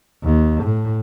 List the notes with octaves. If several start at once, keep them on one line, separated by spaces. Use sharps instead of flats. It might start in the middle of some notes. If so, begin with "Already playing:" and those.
D#2
A2